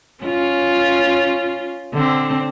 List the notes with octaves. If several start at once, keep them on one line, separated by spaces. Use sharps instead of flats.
C#4 F4
D3 C4